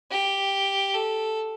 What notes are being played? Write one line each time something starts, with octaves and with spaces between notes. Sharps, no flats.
G4
A4